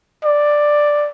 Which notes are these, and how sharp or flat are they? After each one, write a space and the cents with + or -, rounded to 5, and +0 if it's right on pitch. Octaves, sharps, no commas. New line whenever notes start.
D5 +5